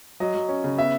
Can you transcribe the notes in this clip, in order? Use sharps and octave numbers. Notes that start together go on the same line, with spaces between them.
F#3 D#5
F#3
C#4
C#3
B3 E5